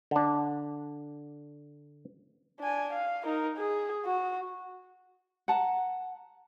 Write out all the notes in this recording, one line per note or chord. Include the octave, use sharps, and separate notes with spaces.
D3 D4
D4 G#5
F5
D#4 A#4
G#4
F#4
F#5 A5 A#5